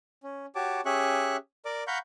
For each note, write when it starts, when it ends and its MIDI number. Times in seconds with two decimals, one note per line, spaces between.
0.23 0.46 61
0.55 0.81 66
0.55 0.81 67
0.55 0.81 73
0.55 0.81 81
0.55 0.81 86
0.85 1.37 61
0.85 1.37 67
0.85 1.37 68
0.85 1.37 76
0.85 1.37 85
0.85 1.37 90
1.65 1.84 70
1.65 1.84 74
1.65 1.84 86
1.87 1.98 77
1.87 1.98 78
1.87 1.98 82
1.87 1.98 83
1.87 1.98 85
1.87 1.98 91